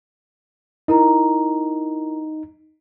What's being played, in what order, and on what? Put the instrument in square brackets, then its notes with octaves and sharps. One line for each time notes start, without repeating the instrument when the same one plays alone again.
[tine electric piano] D#4 [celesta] E4 A#4 A#5